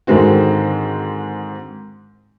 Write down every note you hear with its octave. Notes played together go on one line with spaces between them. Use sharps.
G#2 D3 D#3 G#3 C4 F#4